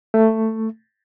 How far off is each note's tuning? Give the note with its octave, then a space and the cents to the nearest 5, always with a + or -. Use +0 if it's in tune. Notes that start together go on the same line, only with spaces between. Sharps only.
A3 +10